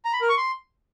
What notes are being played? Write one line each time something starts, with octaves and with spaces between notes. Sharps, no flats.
A#5
B5
A#4
C#6
C6